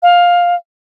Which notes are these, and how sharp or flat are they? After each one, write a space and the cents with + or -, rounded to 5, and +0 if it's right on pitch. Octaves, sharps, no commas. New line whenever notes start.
F5 +10